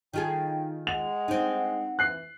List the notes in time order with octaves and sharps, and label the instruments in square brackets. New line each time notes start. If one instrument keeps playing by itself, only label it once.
[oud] D#3 F4 G#4 [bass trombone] D#4 [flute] G5
[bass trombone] G#3 [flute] F#5 [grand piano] F7
[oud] C4 D#4
[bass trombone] E3 [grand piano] F#6 C7